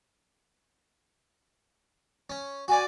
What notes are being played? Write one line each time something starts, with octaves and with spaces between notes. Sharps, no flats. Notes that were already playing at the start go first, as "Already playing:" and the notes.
C#4
F#4 D5 G#5